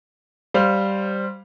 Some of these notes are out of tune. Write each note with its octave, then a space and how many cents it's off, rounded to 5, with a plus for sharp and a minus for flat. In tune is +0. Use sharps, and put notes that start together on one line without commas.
G3 +0 C5 +0 F5 +0